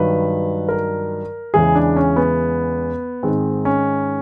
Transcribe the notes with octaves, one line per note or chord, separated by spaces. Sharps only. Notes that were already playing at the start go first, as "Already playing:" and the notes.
Already playing: G2 D#3 F#3 B4
A#4
E2 C#3 E3 G#3 G#4
D4
C#4
B3
G#2 D#3 G#3 C4
C#4